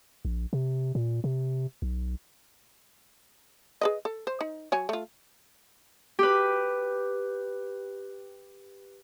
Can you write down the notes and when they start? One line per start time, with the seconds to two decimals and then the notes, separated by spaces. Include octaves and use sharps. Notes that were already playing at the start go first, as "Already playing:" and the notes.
0.25 A#1
0.53 C3
0.95 A#2
1.24 C3
1.82 B1
3.81 G#4 B4 D#5
4.05 A4
4.27 C5
4.41 D#4
4.72 F#3 C#5 G#5
4.89 A3 F4
6.19 G4 B4